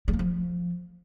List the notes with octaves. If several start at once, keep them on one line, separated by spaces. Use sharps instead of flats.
G3
A#3
F3